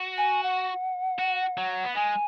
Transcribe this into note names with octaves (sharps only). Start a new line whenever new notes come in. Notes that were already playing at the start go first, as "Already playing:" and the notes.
Already playing: F#4
G#5
F#5
F#4
F#3
B3
G#3 G#5